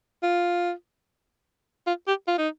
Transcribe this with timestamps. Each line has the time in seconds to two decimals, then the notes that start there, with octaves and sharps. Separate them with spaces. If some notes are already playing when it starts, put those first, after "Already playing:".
0.23 F4
1.87 F4
2.07 G4
2.27 F4
2.38 D#4